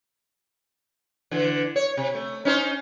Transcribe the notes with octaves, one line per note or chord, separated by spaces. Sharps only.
D3 E3
C#5
C3
A3
C#4 D#4 C5